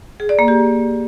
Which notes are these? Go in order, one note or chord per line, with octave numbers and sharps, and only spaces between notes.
G#4
D5
A#3
G4